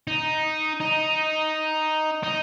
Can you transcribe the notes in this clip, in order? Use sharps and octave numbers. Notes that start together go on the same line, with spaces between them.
D#4
D#4
D#4